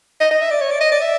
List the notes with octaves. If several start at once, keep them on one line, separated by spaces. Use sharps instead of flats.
D#5
D#5
E5
D5
C#5
D5
D#5
D5
E5